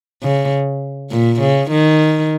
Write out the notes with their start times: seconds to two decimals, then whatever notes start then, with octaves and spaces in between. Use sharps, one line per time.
0.23 C#3
1.12 A#2
1.41 C#3
1.71 D#3